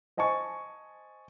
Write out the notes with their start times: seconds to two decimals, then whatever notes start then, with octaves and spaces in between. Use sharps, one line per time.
0.17 C5 D#5 G#5 A5 C#6